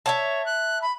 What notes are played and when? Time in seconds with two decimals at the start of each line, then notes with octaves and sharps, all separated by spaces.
0.06 C#5 E5 F#5 A5
0.46 F#6
0.82 B5